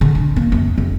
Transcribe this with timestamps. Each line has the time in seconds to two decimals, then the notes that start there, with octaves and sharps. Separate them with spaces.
0.01 D3
0.15 D4
0.36 A#3
0.52 F#2
0.78 F2